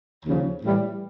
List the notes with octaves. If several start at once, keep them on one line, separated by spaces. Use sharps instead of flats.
D#2 C#3 F3
A2 E3 G3